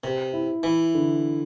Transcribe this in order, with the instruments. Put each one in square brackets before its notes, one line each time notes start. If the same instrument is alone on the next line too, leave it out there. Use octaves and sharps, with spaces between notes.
[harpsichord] C3 [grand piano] B4
[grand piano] E4
[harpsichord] E3 [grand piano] E4
[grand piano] D3